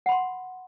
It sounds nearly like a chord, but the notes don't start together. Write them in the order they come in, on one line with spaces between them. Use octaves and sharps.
F#5 B5 C6